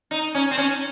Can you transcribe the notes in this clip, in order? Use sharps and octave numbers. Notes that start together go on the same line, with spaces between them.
D#4
C#4
C4
C#4